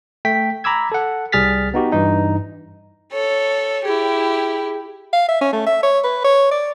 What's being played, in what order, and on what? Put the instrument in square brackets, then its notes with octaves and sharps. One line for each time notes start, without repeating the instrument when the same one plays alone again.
[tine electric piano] A3 G5 B6
A#5 B5 D6 E6 G#6
A4 F#5
C2 G3 G#4 F6 A6 B6
B3 D#4 F#4 G4
G2 E3 D#4
[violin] A4 C#5
[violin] E4 G4 [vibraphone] G#4
[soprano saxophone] F5
E5
C#4
A3
E5
C#5
B4
C#5
D5